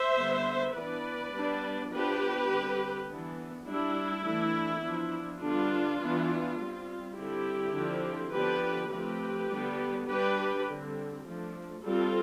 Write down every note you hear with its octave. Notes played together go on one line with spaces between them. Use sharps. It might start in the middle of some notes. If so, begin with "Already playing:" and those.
Already playing: C5 E5
D3 G3 B3
E3 B3 D4 B4 D5
G3 B3 D4
F3 B3 D4 G4 B4
D3 G3 C4
E3 B3 D4
G3 D4 E4
E3 A3 D4
F3 B3 D4
D3 G3 B3 D4 F4
E3 B3 D4
G3 C4
D3 G3 C4 E4 G4
D3 F3 C4
D3 F3 B3 D4 G4 B4
F3 A3 C4 G4 B4
D3 G3 B3 D4
G3 D4 G4 B4
D3 G3 C4
F3 A3 D4
G3 C4 F4 A4